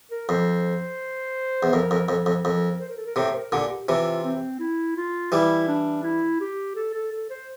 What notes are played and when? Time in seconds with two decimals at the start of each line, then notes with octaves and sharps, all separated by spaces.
0.11 A#4
0.29 F2 C5
1.63 E2
1.73 F2 A#4
1.91 F2
2.08 F2 A4
2.26 F2
2.45 F2 A#4
2.80 C5
2.89 A#4
2.97 A4
3.06 A#4
3.16 A2 C3 C5
3.34 A#4
3.52 A#2 D3 G4
3.70 G4
3.88 C3 E3 F4
4.24 C4
4.60 E4
4.96 F4
5.32 E3 G3 E4
5.68 D4
6.03 E4
6.40 G4
6.76 A4
6.94 A4
7.12 A4
7.30 C5